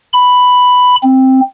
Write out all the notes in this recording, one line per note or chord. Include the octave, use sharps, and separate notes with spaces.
B5
C4